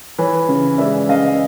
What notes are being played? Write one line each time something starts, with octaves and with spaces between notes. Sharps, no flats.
E3 B4 C#5
C#3
G#3 D5 E5
C#3 D#5 F5